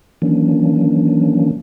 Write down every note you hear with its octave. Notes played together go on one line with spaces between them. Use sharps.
D#3 E3 F#3 A#3 C#4 D4